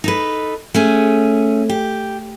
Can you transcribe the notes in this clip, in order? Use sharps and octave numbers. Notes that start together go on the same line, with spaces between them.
D#4 A4 B4
A3 C#4 G#4
G4